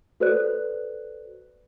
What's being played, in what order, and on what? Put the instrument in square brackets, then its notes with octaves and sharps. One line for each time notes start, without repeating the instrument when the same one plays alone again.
[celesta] F#4 A4 B4 C5 D5 F#6